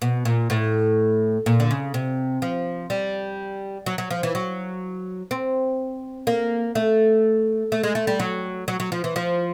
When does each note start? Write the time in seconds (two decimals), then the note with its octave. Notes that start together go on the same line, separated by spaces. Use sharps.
0.02 B2
0.25 A#2
0.50 A2
1.46 A#2
1.60 D3
1.71 C#3
1.94 C3
2.42 F3
2.90 G3
3.86 F#3
3.98 F#3
4.11 F3
4.23 E3
4.35 F#3
5.31 C4
6.27 A#3
6.75 A3
7.72 A3
7.83 G#3
7.95 A3
8.07 G3
8.20 F#3
8.68 F#3
8.80 F#3
8.92 F3
9.04 E3
9.16 F3